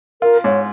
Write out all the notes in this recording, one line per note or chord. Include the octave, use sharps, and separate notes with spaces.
F4 A#4
G#2 C#5